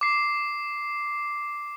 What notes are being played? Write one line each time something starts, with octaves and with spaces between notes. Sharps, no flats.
D6 C7